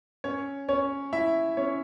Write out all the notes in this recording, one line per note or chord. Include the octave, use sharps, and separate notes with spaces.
C#4 C#5
C#4 C#5
E4 E5
C#4 C#5